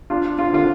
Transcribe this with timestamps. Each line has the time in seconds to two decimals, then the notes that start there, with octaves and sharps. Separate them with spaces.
0.10 D4 F4
0.39 F4
0.53 D3 F4